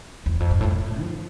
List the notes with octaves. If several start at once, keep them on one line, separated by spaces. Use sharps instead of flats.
E2
F2
G2
A2
A#2
A2
F3